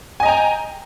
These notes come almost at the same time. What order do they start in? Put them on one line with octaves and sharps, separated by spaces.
G#5 D#5 A#5 G5